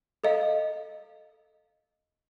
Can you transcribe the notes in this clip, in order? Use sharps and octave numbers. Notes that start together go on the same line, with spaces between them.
A4 D#5 F5